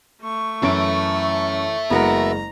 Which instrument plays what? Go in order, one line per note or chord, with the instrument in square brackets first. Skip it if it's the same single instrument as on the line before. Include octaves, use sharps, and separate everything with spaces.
[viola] A3 C#6
[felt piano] F#2 D7 [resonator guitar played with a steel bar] E3 [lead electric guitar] A4 E5
[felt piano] F#1 G#3 [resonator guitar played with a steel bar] B3 F#4 A#4 [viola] A#5